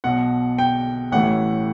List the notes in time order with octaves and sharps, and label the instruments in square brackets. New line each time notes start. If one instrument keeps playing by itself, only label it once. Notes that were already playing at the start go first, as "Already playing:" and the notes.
[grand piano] B1 B2 F#5
G5
A1 A2 E3 F#5